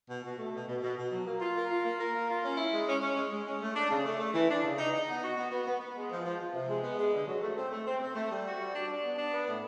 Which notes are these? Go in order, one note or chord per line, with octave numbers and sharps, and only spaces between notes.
B2
B2
A3
B2
B2
B2
B2
F#3
A#3
F4
A#4
F4
A#3
A#4
A#3
F4
C#4
E4
G#3
C#4
C#4
G#3
G#3
C#4
A3
D4
C#3
A3
A3
E3
D4
C#3
D#4
D#4
B3
F#4
B3
B3
B3
B3
G#3
F3
F3
F3
C3
G#3
B3
G#3
D3
F#3
A3
C4
A3
C4
C4
A3
G3
F#4
G3
D4
D4
B3
D4
B3
A2